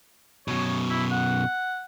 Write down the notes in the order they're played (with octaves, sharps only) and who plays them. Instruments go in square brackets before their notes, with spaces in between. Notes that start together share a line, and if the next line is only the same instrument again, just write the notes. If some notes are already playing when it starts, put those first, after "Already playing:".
[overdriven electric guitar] F#2 B2 [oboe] C#5
[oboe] E4
F#5